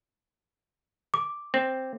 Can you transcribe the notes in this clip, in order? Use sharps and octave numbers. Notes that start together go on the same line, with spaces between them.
D6
C4